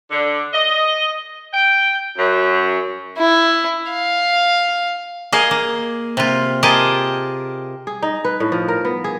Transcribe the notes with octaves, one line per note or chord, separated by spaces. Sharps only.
D3
D#5
G5
F#2
E4
F5
A#3 G#4 D#5 F5
A#3
C3 F4
F4 G4 G#4 A#4 D#5 A5
G#4
D#4
B4
A2
F3
A#4
B3
G#4